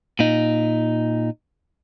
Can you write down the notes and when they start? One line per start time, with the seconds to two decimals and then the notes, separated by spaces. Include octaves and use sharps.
0.19 A#2 D#4